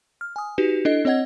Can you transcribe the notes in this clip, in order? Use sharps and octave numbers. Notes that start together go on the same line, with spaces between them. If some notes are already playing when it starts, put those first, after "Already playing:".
F6
G#5 D#6
D#4 F#4 G4 B4
D4 E4 A4 D#5
C4 C#5 D#5 F#5 G#6